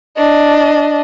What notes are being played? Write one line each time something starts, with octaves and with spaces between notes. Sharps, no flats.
D4 D#5